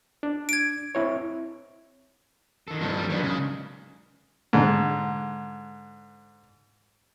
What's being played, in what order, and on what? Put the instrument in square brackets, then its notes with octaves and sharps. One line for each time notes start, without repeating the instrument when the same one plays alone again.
[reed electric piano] D4
[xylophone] G#6 D7
[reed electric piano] C4 E4 C#5
[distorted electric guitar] D#3 A4
[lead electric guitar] G2 F3
[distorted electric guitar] G3
[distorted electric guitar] D#3 B3 [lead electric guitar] F#3 D4
[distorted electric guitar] C#2 [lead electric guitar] C#3
[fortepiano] G#2 D3